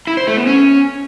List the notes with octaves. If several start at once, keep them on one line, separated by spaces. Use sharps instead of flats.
E4
C5
A3
B3
C#4